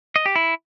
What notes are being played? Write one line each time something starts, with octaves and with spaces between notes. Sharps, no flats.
D#5
G4
E4